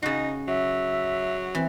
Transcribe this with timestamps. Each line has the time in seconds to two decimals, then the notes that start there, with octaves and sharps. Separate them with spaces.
0.02 C#3 D#4 F#4
0.48 F#3 E5
1.55 E3 C4